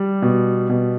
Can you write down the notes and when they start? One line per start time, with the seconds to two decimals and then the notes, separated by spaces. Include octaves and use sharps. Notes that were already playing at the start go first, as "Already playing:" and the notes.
Already playing: G3
0.22 B2
0.69 B2